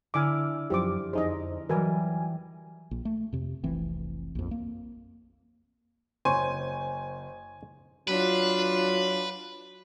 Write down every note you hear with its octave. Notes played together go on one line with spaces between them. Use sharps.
D3 E4 G#5 D6 F6
F#2 F3 G4 C5 D6
F2 D#4 G#4 C5 D#5
E3 F#3 G3 A#4 B4 G#5
A#1
A3
F2 C3
F1 C2 E3 C4
A#1 F2
A#3
F#1 C5 C#5 G#5 D#7
F#3 D4 F4 B4